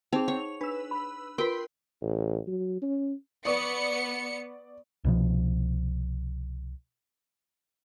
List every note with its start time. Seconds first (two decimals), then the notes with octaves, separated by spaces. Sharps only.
0.13 C4 D#4 G#4 F7
0.28 C#5 F#5
0.61 D4 B4 E6
0.91 B5
1.38 F4 A#4 B4 G5 B5 C6
2.02 A1
2.48 F#3
2.82 C#4
3.45 B3 D5 C#6 D#6 C#7
5.04 C2 B2 F3